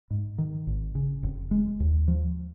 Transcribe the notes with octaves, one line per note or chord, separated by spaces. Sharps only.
G#2
D#3
G#1
C#3
F1
G#3
D#2
F3